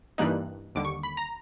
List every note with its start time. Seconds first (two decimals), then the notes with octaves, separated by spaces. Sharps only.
0.18 G2 E3 G3 A#3 D#4 F#6
0.75 D#2 D3 G3 D6
0.85 C#6
1.03 B5
1.17 A#5